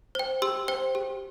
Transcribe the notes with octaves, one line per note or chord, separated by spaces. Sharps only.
C5 G5
G4 C6 E6
C5 G5
G4